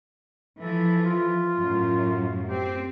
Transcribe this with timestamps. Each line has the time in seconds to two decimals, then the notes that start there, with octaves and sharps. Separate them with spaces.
0.60 E3 F3 A4
1.05 F4
1.57 F#2 A2
2.48 C4 G4